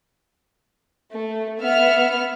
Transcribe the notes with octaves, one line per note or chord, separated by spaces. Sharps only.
A3
B3 E5 F6